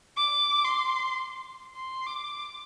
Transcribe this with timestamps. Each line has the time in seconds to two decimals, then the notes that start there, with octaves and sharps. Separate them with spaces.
0.17 D6
0.64 C6
1.75 C6
2.07 D6